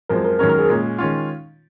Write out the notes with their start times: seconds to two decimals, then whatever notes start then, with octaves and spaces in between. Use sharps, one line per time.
0.10 F#2 F3 G#3 C4 A#4
0.24 A#4
0.39 F#2 D#3 G#3 C#4 A#4
0.49 A#4
0.59 G#4
0.69 A#2 G#3 C#4
0.98 D#3 G#3 C#4 F4